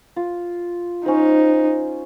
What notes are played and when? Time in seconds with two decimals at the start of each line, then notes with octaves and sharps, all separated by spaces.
0.16 F4
1.06 C#4 D#4 C5